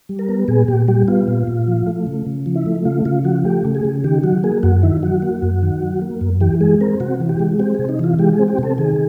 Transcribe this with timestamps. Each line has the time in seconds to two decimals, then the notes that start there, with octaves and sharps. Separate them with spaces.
0.09 G3
0.19 A#4
0.29 B3
0.48 A#2 G#4
0.68 A#2 G4
0.88 G3 G4
1.08 B3 F4
1.28 A#2
1.47 A#2
1.68 F3
1.87 A3
2.07 C#3
2.26 C#3
2.46 F3
2.56 E4
2.66 A3
2.85 C#3 F4
3.05 C#3 F4
3.24 F3 F#4
3.45 A3 G4
3.65 C#3
3.75 G#4
3.85 C#3
4.04 D#3 G4
4.23 F#3 F#4
4.44 A#3 G#4
4.63 F#2 F#4
4.83 D#3 E4
5.03 F#3 F#4
5.22 A#3
5.42 F#2
5.63 D#3
5.82 F#3
6.02 A#3
6.21 F#2
6.41 E3 G4
6.61 G#3 G#4
6.81 C4 A#4
7.00 C3 F#4
7.20 E3
7.29 G4
7.39 G#3
7.59 C4 G4
7.75 C3 G#4
7.89 D#4
7.99 E3 F4
8.19 G#3 G4
8.33 G#4
8.39 C4
8.48 G4
8.58 C3 A4
8.78 D#3 G#4